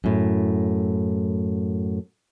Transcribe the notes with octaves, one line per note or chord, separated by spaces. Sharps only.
F#2 A2